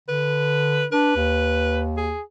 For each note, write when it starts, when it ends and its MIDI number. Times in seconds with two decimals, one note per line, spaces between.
0.08 0.87 50
0.08 0.86 71
0.92 1.12 62
0.92 1.82 71
1.16 2.15 39
1.97 2.22 68